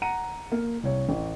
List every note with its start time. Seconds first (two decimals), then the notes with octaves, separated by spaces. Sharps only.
0.02 F#5 A#5 C#7 D#7
0.52 A#3
0.83 C2 C#5
1.09 A1